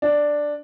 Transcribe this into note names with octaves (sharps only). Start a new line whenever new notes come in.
D4